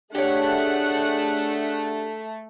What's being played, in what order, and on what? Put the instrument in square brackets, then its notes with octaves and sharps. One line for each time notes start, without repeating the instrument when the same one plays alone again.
[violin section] A3 [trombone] D4 [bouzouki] G4 C#5 [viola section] G#4 F#5